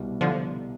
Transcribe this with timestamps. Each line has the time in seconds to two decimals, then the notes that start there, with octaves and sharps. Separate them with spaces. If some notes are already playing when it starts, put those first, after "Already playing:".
Already playing: C2 B2 G3
0.21 D3 F3